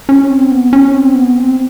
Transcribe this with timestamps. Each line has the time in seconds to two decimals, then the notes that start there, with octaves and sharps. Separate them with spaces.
0.09 C#4
0.30 C4
0.52 B3
0.73 C#4
0.94 C4
1.15 B3
1.37 C4